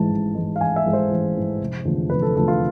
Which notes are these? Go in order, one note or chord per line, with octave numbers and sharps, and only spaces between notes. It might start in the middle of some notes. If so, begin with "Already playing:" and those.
Already playing: A1 G#2 E3 G#3 A5
A1
G#2 E3 G#3
F5
A1 G#5
E5
G#2 E3 G#3
C5
A1
G#2 E3 G#3
F1
E2 D3 F3 A3
F1 B4
A4
E2 D3 F3 A3 A4
F4